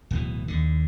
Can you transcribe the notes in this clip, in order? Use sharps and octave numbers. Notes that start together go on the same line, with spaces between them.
D1 B2 E3
D#2 D3